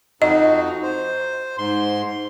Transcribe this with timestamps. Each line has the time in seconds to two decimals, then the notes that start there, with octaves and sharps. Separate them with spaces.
0.22 F2 D#4 F#4 D#5
0.83 C5
1.58 G#2 C6